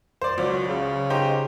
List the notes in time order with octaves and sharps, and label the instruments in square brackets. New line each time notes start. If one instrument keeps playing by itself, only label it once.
[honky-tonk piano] C5 D5
[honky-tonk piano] C#2 [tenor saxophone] F#3
[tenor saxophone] C#3
[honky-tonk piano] D#4 G4 C5